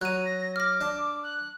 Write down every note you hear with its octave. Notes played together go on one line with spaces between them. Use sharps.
F#3 A#5 F#6 D#7
A#6
D6 F6 A#6
D4
F#6